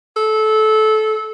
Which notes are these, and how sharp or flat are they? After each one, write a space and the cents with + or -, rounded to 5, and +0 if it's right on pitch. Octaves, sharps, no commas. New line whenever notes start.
A4 -20